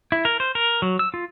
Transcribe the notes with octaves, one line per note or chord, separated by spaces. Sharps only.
E4
A#4
C5
A#4
F#3
E6
F4